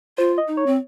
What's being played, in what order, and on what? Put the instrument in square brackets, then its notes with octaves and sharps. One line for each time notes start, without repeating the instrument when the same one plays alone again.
[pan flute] F4 [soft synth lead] C5
[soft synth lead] D#5
[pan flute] D#4
[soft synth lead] C#5
[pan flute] C4